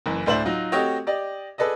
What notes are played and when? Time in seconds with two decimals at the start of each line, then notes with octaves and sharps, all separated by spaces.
0.06 F#1 E3
0.26 D2 A2 D4 C5 E5 F#7
0.45 F#3 D#4 F4
0.72 A3 C4 F#4 G4 C#5 D#5
1.07 G4 D5 D#5
1.58 G#4 A4 B4 D5 D#5